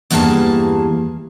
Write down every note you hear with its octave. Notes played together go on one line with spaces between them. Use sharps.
E2 G2 E3 A#3 G#4 A5